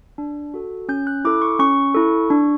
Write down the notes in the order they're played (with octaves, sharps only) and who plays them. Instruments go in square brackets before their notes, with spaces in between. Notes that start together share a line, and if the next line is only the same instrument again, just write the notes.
[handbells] D4
F#4 A4
C#4 G6
F#6
E4 A4 D6
C#6
C#4 C#6
E4 A4
D4